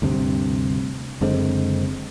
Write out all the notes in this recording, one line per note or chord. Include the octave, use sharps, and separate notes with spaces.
D2 G2 C3
F#1 D3 G#3 C4